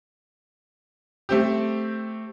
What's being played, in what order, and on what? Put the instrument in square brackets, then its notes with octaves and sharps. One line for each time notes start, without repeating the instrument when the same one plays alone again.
[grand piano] A3 C4 G4